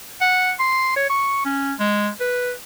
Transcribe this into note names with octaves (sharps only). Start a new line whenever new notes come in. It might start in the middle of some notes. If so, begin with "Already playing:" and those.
F#5
C6
C#5
C#6
C#4
G#3
B4